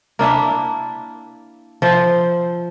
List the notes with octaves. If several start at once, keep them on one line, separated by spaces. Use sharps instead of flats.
A#3 D4 E4 E5
F3 C5 E5